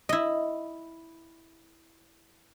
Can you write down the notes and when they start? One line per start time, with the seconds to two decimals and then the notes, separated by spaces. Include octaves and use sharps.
0.09 E4 D#5